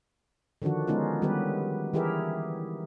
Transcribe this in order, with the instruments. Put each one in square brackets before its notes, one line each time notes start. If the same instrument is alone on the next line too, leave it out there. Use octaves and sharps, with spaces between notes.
[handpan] D3 D#3 F3 D4 F#4
G#3 B3 C#4 D#4 F4
D#3 G3 B3 G4 B4
E3 E4 G4 G#4 A#4 E5